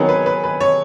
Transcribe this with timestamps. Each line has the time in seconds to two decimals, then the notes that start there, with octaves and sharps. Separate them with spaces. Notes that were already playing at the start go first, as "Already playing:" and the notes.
Already playing: D#3 F#3 B3 G#4
0.09 B4
0.26 B4
0.44 B4
0.60 C#5